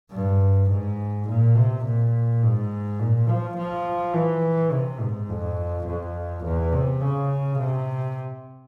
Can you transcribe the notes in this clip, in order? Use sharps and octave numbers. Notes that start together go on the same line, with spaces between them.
G2
G#2
A#2
C3
A#2
G#2
A#2
F3
F3
E3
C3
G#2
F2
F2
E2
C3
C#3
C3